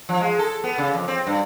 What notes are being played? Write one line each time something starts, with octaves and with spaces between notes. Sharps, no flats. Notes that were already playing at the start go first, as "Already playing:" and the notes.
F3
G#3
A4
B3
C#3
F2
C4
G2